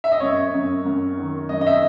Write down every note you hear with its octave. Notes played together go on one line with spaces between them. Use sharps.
E5
D#5
F#2 C#5
F#2
F#2
D#3
F#2 D#5
D#5
E5